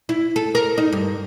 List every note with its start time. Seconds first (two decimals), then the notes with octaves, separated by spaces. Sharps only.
0.09 E4
0.36 A4
0.55 A#4
0.78 D#4
0.92 G2